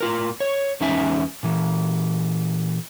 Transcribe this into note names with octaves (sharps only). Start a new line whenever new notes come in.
A2 F4 A#4
C#5
E2 G#3 C#4 D#4 E5 G#5
A#2 E3